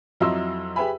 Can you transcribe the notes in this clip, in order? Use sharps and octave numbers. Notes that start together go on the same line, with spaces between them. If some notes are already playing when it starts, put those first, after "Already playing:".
F2 F#3 E4 D#5 C6 E6
G4 G#4 B4 E5 G#5 B5